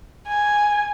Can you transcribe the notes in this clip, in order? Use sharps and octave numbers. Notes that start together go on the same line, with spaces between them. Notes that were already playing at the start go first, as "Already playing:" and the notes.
G#5